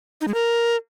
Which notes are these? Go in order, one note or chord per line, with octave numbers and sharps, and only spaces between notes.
D#4
G#3
A#4